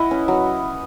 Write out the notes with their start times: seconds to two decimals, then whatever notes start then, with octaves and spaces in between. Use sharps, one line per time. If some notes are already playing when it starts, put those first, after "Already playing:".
Already playing: E4 B4 D#5 F#5
0.11 C#4
0.28 F#3